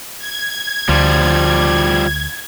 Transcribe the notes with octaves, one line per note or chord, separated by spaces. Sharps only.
G#6
D2 F3 G3